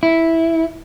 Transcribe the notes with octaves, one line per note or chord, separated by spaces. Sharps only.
E4